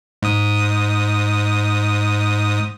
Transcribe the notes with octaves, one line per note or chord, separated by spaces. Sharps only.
G#2 D#6